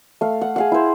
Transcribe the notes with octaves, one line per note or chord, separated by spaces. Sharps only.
A3 F5
F#5
G#4 F5 F#5
E4 C5